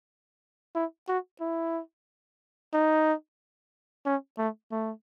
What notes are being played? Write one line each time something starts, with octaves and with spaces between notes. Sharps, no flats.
E4
F#4
E4
D#4
C#4
A3
A3